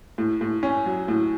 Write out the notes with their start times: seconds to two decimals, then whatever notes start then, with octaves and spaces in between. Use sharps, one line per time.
0.18 A2
0.41 A2
0.63 C#4
0.86 F#3
1.08 A2